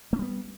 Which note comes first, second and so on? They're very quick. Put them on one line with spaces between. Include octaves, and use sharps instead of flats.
A3 C#4 G3 B3